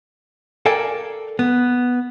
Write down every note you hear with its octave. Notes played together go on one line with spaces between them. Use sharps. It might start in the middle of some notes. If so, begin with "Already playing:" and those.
A4 A#4 D5 F5 G5 G#5
B3